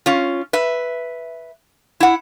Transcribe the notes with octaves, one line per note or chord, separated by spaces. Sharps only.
C#4 F4
B4 E5
E4 F#5